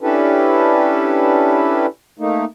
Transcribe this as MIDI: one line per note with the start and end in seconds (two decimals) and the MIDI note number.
0.01 1.86 61
0.01 1.86 62
0.01 1.86 64
0.01 1.86 67
0.01 1.86 69
0.01 1.86 71
2.19 2.45 57
2.19 2.45 58
2.19 2.45 63